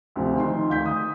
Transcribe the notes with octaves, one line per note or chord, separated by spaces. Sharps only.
D2 C3 F3
D#3 C6
D2 F5 G6 B6
D#6